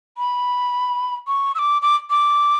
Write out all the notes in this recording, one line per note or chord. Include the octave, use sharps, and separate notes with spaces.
B5
C#6
E6
D6
D6
D6